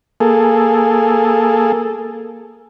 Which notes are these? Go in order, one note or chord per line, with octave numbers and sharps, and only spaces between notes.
A#3 G#4 A4